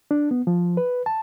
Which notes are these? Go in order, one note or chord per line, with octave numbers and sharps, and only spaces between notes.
D4
B3
F3
B4
A5